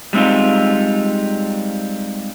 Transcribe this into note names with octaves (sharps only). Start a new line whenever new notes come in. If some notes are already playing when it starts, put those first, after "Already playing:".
G3 G#3 C4 D#4 F4